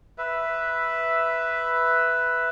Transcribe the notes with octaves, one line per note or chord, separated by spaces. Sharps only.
B4 E5